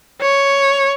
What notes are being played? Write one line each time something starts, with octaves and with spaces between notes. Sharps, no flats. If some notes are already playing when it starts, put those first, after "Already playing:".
C#5